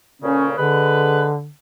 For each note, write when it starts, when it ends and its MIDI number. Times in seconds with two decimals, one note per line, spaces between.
0.22 0.53 38
0.22 0.53 46
0.22 0.53 49
0.22 0.46 61
0.57 1.48 50
0.57 1.24 56
0.57 1.24 71